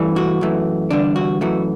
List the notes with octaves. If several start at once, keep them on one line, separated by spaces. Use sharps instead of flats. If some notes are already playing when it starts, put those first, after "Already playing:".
Already playing: G2 E3 A3
F#4
F#2 E3 A3
E2 D3 G3 D4
F#4
F#2 E3 A3 F#4